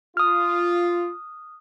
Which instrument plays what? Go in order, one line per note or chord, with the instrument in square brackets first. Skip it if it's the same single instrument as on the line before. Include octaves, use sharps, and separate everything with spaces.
[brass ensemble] F4 [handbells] D#6 F6